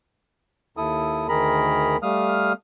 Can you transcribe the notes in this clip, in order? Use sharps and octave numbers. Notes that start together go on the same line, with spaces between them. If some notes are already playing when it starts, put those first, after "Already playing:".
D#2 E4 A4 D#6
D2 D#3 G#4 A#4 A#5 B5
G3 A3 F5 D#6 F6